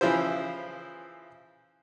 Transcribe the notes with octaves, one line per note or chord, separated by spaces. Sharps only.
C#3 E3 F3 E4 C5